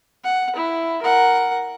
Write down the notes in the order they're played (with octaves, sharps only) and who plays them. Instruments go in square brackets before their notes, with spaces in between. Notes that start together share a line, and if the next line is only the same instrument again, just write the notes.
[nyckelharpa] F#5
E4
A#4 F#5